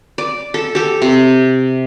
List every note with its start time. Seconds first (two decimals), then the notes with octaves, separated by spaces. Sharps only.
0.18 D5
0.54 A4
0.75 G4 A4
1.02 C3